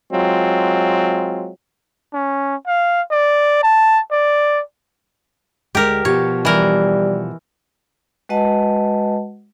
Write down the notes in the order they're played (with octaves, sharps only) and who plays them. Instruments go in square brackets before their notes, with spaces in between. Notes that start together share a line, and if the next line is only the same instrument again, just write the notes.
[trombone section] F#3 G#3 C4 F4
[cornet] C#4
F5
D5
A5
D5
[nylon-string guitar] D2 G#3 [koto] G4 A#4
[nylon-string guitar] B2 F3 G4 [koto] C#5
[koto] E3 A#4 [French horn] G3
[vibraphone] G#3 F#4 B4 D#5 F#5 A5